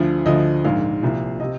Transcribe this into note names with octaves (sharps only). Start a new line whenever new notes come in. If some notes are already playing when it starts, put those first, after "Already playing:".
Already playing: D2 D3 F3
D2 D3 F3 D#5
A#1 G#2 D#3 F5
C2 A#2 F3
C3 D#5